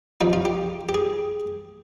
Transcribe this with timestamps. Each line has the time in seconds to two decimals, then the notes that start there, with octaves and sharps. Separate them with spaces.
0.21 C3 F3 D#4
0.33 F4
0.45 G4
0.89 G4
0.94 G#4